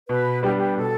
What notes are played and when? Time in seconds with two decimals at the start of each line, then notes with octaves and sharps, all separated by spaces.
0.08 B2 B4
0.43 G3 B3 D4 G4 B4
0.58 G4
0.77 B2 A4